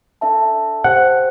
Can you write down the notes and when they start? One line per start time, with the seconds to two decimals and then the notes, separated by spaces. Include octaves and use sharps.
0.21 D4 A4 E5 A5
0.84 G4 C5 F#5 G5